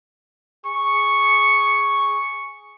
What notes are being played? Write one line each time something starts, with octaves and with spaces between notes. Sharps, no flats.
G#4 C#6